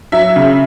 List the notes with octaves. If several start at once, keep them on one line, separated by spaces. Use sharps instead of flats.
F#3 E5
C#3